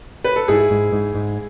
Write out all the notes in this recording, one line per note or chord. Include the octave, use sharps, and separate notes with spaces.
B4
A4
G#2 E4 G#4
G#2
G#2
G#2